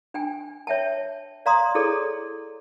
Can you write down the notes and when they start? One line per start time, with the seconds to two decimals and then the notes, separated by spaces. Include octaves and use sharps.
0.14 D4 G5 G#5
0.67 C#5 E5 G5 A5
1.46 D5 F5 A#5 C6 D#6
1.75 E4 G#4 A4 C#5 D5